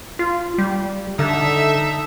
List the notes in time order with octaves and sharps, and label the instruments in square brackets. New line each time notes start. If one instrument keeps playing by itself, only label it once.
[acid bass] F4
G3
[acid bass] D3 [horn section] D#4 A4 E5